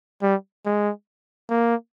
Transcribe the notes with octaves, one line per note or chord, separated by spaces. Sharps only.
G3
G#3
A#3